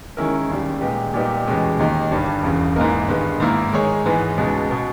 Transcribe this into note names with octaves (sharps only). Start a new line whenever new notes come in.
D#3 G#3 C#4 E4 A#4
D#2 C#3 G3
A#2 G#3 B3 D#4 G4
A#2 G3 B3 D#4 G4
E2 B2 G#3 C#4 G4
D#2 D#3 A#3 D#4 G4
G1 G2 G3
E1 E2 C#3
G#2 E3 A#3 D#4 A#4
G2 D#3 G#3 B3
G#2 D#3 A#3 E4 A#4
D#3 G#3 D#4 G#4 C#5
G#2 E3 G#3 B3
C#2 B2 G#3
B2 G#3